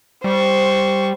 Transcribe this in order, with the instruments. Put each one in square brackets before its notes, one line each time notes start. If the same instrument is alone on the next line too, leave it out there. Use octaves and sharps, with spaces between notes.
[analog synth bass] G3 [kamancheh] C5 C#6